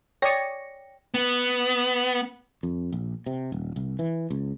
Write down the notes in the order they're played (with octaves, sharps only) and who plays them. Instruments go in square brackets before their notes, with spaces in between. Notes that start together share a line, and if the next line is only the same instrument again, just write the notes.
[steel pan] C#5 D5 D#6 [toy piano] G5 [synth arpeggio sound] A#6 C#7
[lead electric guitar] B3
[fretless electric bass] F2
A#1
C3
D#1
C2
E3
C#2